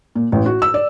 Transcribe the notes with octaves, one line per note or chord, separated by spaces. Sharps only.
A#2
A1
F#4
E6
D5